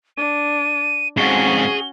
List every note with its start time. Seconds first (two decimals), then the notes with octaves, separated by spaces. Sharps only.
0.17 D4 D#7
1.17 F2 G#2 C#4 F#4 G#4 G7